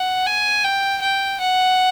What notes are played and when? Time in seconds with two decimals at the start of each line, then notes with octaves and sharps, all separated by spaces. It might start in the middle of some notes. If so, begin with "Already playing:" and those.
Already playing: F#5
0.26 G#5
0.65 G5
1.02 G5
1.40 F#5